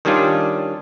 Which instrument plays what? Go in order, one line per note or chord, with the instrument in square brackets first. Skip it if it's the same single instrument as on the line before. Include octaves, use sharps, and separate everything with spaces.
[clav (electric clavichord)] D#3 G3 C#4 D4 F4